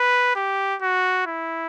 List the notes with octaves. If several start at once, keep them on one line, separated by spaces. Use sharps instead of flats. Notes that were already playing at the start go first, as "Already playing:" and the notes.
Already playing: B4
G4
F#4
E4